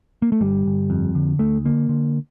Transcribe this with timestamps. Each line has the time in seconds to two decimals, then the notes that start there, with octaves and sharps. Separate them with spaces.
0.22 A#3
0.32 A3
0.41 G1 G3
0.66 G1
0.90 F2
1.15 D3
1.39 D2 A3
1.65 D3 A#3
1.89 D3